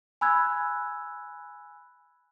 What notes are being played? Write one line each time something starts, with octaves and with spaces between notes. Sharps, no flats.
G#5 B5 E6 F#6 G#6